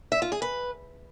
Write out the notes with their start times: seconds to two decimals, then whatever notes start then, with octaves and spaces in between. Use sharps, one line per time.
0.12 E5
0.22 F4
0.32 G#4
0.42 B4